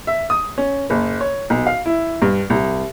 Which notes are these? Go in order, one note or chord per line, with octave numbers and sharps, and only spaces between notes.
E5
D#6
C#4
F#1
C#5
B1
F5
E4
G2
C2